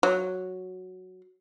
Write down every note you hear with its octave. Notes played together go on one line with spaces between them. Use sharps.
F#3